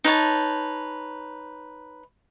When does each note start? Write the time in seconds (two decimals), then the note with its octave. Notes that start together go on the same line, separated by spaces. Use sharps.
0.04 D#4 B4 C#5 A5